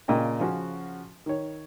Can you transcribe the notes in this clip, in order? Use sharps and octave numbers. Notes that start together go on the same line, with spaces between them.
A#2 C#3 D#5 G5
C#3 F3 C#4 F#4
D#3 C#5